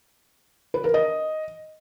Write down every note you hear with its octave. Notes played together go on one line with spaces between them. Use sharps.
B4
A#4
D#5